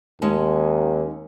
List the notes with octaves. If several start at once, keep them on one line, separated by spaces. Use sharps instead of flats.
D#2 G#3 C#4 A5